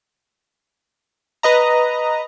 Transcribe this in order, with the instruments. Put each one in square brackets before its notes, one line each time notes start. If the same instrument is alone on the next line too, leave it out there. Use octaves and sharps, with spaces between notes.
[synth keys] B4 D#5 A#5